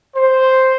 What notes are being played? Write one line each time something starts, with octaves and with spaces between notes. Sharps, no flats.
C5